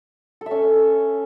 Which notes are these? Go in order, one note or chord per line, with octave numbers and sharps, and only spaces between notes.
A4
E5
C#4